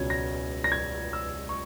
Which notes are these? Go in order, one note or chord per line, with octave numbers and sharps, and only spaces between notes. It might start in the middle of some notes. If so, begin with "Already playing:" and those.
Already playing: C#2 B2 C#4 G#6
A#6
A#6
G#6
E6
C#6